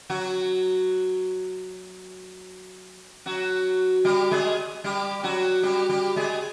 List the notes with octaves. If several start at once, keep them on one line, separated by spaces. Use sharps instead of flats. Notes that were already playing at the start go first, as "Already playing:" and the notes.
F#3 F#4
F#3 F#4
G3 G4
G#3 G#4
G3 G4
F#3 F#4
G3 G4
G3 G4
G#3 G#4